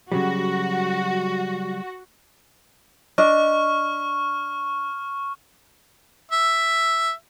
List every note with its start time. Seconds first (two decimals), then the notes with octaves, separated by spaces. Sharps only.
0.12 C#3 F#3 G3 F#4
3.18 D4 D#5 C#6 F6
6.31 E5